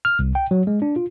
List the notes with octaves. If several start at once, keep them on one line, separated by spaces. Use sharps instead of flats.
F6
C2
G5
F#3
G#3
D4
F4